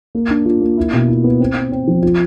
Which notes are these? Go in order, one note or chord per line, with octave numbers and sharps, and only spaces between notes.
A#3
D4
F4
A#3
E4
B2
E4
B3
C4
C4
C4
F3
F4